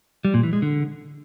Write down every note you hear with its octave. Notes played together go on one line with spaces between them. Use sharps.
G3
A#2
E3
G#3
D3